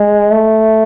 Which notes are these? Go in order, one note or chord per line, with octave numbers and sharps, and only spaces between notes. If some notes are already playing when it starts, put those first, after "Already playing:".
Already playing: G#3
A3